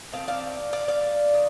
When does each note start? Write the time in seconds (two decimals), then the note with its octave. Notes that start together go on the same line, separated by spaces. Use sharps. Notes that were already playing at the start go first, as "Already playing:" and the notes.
0.13 D#3 A3 C4 F5
0.28 D5 F5
0.73 D5 F5
0.88 D5 F5
1.34 D#3